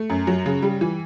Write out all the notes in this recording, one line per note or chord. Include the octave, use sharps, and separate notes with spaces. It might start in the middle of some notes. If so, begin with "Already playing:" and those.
Already playing: A3
F#2
F#3
C#3
G3
E3